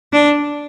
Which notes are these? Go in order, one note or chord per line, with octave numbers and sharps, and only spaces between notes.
D4